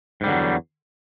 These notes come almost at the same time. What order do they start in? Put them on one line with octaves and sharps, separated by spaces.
G#2 G3 D3 F#3 E2